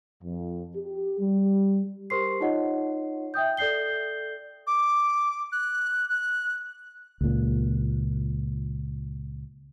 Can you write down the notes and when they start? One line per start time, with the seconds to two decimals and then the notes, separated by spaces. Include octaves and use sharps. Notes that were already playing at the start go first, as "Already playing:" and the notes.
0.24 F2
0.76 G4
1.21 G3
2.10 G4 A#4 C5 C6 C#6 C7
2.41 D#4 F4 C#5 D#5 F#5
3.34 E5 G5 D#6 G6
3.57 A4 D5 G6 C7 G7
4.67 D6
5.52 F#6
6.09 F#6
7.21 C#2 A#2